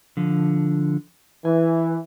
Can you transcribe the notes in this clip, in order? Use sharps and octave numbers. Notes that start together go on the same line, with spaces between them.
D3 F3
E3 G#5